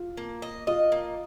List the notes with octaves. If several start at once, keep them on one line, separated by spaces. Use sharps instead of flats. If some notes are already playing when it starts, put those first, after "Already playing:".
Already playing: F4
A#3
D#5
F4 D#5
A#3